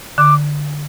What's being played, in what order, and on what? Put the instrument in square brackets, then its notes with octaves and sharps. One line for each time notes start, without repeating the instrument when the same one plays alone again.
[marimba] D3 [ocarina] D6